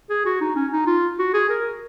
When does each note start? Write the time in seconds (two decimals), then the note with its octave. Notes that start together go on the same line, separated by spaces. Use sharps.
0.10 G#4
0.26 F#4
0.41 D#4
0.56 C#4
0.72 D#4
0.87 F4
1.19 F#4
1.34 G#4
1.49 A#4